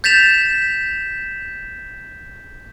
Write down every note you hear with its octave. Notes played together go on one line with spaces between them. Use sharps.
G6 A6 B6 E7 F7